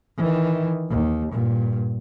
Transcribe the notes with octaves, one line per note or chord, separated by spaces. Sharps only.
D#3 E3
D#2
G2 A#2